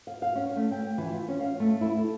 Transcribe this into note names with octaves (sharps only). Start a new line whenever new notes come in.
F5
F5
C#4
A3
G5
E3
F4
C#4
F5
A3
E4
A4